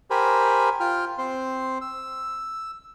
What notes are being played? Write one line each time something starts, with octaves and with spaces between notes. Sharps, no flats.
G4 A#4 C5 G#5 B5
F4 G5 F6
C4 C5 C6
E6